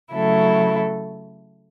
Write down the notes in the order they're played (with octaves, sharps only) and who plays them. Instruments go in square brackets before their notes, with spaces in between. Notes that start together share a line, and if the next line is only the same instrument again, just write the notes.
[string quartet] C#3 F#3 A3 E4 A4